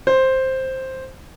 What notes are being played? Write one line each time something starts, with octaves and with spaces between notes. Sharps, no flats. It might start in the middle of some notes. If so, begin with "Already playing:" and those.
C5